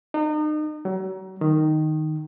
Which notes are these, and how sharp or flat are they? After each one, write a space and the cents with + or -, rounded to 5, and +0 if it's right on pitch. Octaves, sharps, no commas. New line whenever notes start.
D#4 -35
F#3 +35
D#3 -5